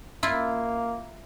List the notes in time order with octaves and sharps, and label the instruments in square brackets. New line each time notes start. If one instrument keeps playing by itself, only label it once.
[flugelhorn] A#3 [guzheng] E4 F4